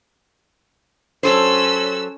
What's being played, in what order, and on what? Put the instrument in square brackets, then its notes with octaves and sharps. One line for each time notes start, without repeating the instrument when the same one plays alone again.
[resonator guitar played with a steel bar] F#3 A4 C5 [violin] C#4 E6